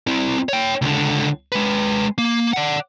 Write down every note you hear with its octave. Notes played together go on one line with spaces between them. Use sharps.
C4 E4
C#5 G5
C#2 D3
G#3 B4
A#3
D5 F#5